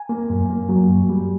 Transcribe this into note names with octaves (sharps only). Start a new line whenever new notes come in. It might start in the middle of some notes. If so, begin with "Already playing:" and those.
Already playing: G#5
A#3
F#2
A#3
F#3
F#2
G3